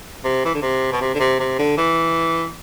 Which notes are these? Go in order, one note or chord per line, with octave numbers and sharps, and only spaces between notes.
C3
E3
D3
C3
B2
C3
D3
C3
C3
D3
E3